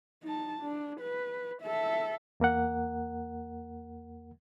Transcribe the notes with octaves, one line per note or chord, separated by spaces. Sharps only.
D#4 A5
D4
B4
A4 E5
E2 A#3 A#4 F#5